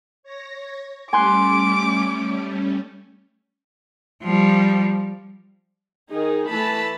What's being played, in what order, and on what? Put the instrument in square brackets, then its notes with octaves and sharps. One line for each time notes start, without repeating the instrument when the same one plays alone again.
[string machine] C#5 A#6
[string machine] G3 A3 C#4 [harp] G#5 C6 F#6 [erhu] D6
[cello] F3 G3
[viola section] D#3 D#4 G#4
E3 A3 A5 B5